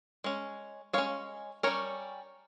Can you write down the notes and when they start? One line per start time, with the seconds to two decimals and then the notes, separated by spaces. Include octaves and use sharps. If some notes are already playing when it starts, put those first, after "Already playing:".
0.24 G#3 C#4
0.93 G#3 C#4 C#5 F5
1.63 G3 C#4 A#4 C#5